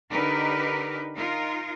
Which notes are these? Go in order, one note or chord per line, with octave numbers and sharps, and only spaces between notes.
D3 D#4 G4 A#4 B4
D#4 F4 A#4